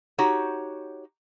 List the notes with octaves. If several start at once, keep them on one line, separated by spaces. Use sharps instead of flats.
D#4 F#4 G4 C#5 F#5